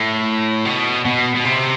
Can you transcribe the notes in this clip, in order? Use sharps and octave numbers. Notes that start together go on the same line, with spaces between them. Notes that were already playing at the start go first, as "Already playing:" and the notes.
Already playing: A2
B2
B2
B2
C3